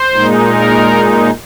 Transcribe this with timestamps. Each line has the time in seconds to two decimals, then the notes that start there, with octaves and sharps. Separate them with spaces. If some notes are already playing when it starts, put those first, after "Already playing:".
Already playing: C5
0.12 A#2 G#3 D#4
0.49 A#4